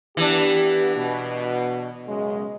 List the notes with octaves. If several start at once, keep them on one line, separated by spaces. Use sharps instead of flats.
E3 B3 D4 G4
B2
F#2 C#3 G#3